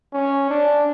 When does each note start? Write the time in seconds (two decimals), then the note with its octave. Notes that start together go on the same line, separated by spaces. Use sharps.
0.13 C#4
0.50 D4